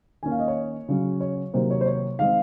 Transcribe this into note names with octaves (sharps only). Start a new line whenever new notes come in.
D#3 A#3 C#4 G#5
F5
D#5
C#5
C#3 F#3 C#4
C#5
C3 D#3 F#3 A#3 C5
C#5
C5
C#5
D#3 G#3 C4 F5